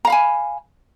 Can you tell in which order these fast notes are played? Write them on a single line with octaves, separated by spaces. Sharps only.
A#5 F5 B5 G#5